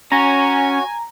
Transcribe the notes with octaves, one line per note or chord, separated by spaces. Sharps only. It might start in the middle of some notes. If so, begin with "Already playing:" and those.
C#4 F#4 C#5 G#5 A#5